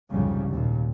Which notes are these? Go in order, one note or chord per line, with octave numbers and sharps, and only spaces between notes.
C2 F2 G#2 C#3 G3
D#2 A#2